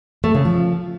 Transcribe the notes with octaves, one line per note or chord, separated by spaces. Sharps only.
A3
C#3
F3